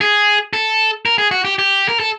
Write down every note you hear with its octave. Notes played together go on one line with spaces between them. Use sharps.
G#4
A4
A#4
G#4
F#4
G4
G4
A#4
A4